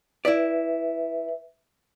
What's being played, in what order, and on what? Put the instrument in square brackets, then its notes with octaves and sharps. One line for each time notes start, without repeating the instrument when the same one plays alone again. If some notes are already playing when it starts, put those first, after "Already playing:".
[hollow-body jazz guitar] E4 D5 [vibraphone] B4 E5